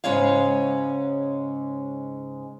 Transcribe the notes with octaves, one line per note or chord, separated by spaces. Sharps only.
G#2 C#3 G#3 C#4 C#5 F5